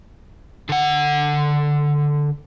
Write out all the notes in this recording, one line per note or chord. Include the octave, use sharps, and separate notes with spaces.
D3 F#5